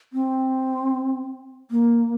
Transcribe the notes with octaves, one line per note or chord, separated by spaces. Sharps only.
C4
A#3